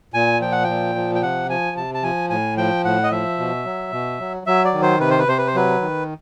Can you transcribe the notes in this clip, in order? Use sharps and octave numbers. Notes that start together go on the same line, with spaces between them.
A#2 G#5
F3 G5
F#5
A#2 G5
F3
G5
C3 F#5
F3 G#5
C3 A5
A5
F3 G#5
A2 G#5
F3 G5
A2 F#5
D#5
F3 E5
B2
F#3
B2
F#3
F#3 E5
D5
D#3
C5
C3 B4
C5
B4
C3 C5
B4
C5
F#3 B4
D#3